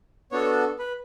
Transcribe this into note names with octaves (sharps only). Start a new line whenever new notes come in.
B3 D4 F#4 A4 C#5
B4